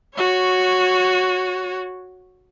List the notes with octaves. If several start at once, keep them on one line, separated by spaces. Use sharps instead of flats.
F#4 C#5